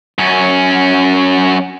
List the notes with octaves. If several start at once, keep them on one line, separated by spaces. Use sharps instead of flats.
F#2 C#4